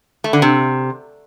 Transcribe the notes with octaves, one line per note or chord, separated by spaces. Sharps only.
A3
D3
C3